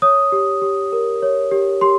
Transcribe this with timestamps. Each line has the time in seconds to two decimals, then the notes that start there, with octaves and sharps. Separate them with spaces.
0.02 C#5 D#6
0.32 G4
0.62 G4
0.92 A#4
1.22 C#5
1.51 G4
1.81 G4 C6